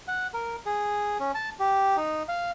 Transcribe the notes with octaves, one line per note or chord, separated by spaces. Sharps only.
F#5
A#4
G#4
C#4
A5
G4
D#4
F5